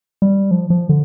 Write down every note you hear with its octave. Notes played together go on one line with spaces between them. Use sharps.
G3
F3
F3
D3